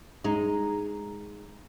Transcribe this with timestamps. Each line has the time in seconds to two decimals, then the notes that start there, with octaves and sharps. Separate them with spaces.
0.24 G#3 D#4